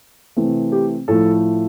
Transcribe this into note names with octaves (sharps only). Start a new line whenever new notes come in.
C3 E3 A3 C4
G4
A2 F3 A3 E4 A4